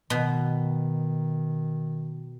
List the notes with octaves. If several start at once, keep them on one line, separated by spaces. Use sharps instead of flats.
B2 D#3